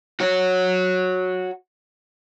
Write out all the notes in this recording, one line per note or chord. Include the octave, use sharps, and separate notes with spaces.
F#4 C#5